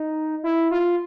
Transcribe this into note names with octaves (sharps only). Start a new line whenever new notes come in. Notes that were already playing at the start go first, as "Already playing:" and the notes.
Already playing: D#4
E4
F4